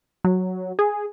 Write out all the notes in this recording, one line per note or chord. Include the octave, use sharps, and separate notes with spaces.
F#3
G#4